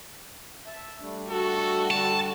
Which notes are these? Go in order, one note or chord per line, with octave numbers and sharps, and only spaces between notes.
E5 A5
G3 A3 D4
F#4 A4
D3 G3 A5